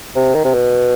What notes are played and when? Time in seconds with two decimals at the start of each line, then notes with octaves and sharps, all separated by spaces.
0.16 C3
0.35 D#3
0.45 C3
0.54 B2